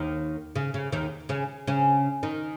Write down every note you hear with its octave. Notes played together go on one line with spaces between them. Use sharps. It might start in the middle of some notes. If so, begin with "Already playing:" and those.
Already playing: D#2 D#3
C#3
C#3
D#2 D#3
C#3 C#4
C#3 C#4
D#3 D#4